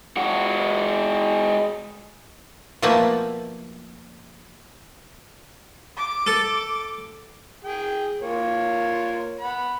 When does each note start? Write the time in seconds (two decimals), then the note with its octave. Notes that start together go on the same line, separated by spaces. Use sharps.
0.17 G#3 F#4
2.82 B2 F3 A3 A#3 B4 A5
5.97 D6
6.27 A4
7.65 G#4 G5
8.22 A#3 F4 C#5
9.40 F#5 B5